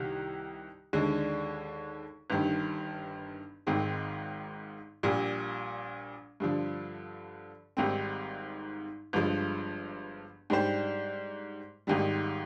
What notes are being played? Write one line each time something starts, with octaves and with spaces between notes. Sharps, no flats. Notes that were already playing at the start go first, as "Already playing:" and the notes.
Already playing: C2 C3 D#3 G3
D#2 D3 G#3 D4
G1 G2 D#3
G#1 G#2 D#3 G#3 C4
A#1 A#2 G3
G2 D3 F3
G#1 G#2 G3 C4
G1 G2 F3 G#3
G#2 G3 D4 G4 C5
G#1 G#2 D#3 G3